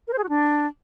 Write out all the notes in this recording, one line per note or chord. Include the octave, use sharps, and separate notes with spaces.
A#4
C5
G#4
F#4
D4